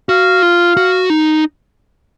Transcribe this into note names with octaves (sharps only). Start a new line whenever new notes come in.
F#4 F5
F4
F#4
D#4